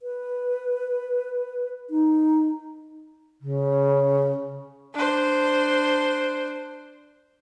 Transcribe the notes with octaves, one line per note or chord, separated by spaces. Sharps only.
B4
D#4
C#3
D4 C5